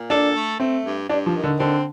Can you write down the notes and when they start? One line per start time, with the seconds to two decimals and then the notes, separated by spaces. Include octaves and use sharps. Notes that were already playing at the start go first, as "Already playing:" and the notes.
Already playing: A#2
0.10 D4 A4
0.36 A3
0.60 A3 C4
0.85 G2
1.09 G2 D4
1.26 F3
1.34 D#3
1.43 D3
1.59 D3 C4